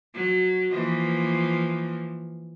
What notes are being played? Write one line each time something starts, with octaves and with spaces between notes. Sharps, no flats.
F#3
E3 F3 A#3